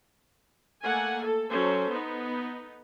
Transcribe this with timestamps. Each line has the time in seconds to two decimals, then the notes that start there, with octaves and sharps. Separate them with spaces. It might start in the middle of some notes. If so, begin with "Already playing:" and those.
0.83 A3 A#3 F#5 G#5
1.22 A4
1.51 F#3 C#4 A4 C5
1.91 B3 D#4